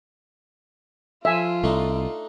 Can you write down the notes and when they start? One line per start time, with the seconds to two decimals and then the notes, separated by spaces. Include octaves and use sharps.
1.25 F3 F4 E5 G#5
1.64 C2 A3 D4 D#4